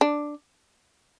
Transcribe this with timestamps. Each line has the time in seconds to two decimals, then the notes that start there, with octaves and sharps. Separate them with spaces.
0.01 D4